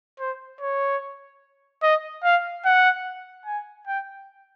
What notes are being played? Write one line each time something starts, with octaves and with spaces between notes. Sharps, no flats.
C5
C#5
D#5
F5
F#5
G#5
G5